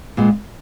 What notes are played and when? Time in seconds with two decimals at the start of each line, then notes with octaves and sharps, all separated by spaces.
0.17 A#2 G#3 B3